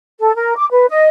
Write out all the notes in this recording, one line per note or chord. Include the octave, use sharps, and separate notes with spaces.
A4
A#4
D6
B4
D#5